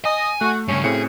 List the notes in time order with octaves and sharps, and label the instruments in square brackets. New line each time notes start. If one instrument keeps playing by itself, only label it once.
[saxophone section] D#5 [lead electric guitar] G#5
[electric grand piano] A3 [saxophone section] F#4
[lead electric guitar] G2 C#3 [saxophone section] C#4
[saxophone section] F#2 C#3 [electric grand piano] A2 C4 C#7 [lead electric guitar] G#4